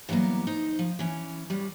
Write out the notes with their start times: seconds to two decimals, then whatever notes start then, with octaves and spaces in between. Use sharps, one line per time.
0.09 E3 F#3 G3 A#3 B3
0.47 D#4 C5
0.79 F3
0.99 E3 C#4
1.50 A2 G3